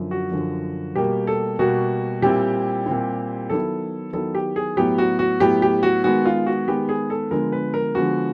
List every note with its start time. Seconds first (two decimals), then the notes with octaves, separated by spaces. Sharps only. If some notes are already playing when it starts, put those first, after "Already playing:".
Already playing: F#2 D3 F3
0.11 F#4
0.32 F#2 D3 F3
0.95 B2 G3 A#3 G4
1.27 A4
1.59 B2 G3 A#3 F#4
2.22 A#2 G3 C4 E4 G4
2.86 A#2 G3 C4 E4
3.49 D#3 F#3 B3 E4 A4
4.13 D#3 F#3 B3 E4 A4
4.35 G4
4.56 G#4
4.77 A2 F#3 B3 G4
4.98 F#4
5.19 F#4
5.40 A2 F#3 B3 G4
5.62 G4
5.83 F#4
6.04 D#3 G#3 B3 F#4
6.25 F4
6.47 F#4
6.67 D#3 G#3 B3 G4
6.89 G#4
7.10 A4
7.31 D3 F3 G#3 B3 A#4
7.52 B4
7.74 A#4
7.95 D3 F3 G#3 B3 F#4